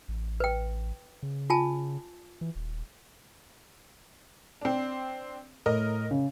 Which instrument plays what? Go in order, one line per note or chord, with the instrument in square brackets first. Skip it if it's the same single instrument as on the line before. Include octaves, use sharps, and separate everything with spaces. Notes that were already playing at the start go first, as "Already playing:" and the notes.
[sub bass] A1
[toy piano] B4 G5
[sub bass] C#3
[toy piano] F4 G#5 A5
[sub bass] E3
D#1
[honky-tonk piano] C4 D4
[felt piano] A2 [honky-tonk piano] A#4 D#5
[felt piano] C#3